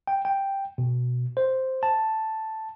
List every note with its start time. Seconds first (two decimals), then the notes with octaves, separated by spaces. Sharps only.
0.07 G5
0.25 G5
0.78 B2
1.37 C5
1.83 A5